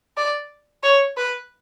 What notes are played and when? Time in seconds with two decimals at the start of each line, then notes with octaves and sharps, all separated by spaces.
0.17 D5
0.83 C#5
1.17 B4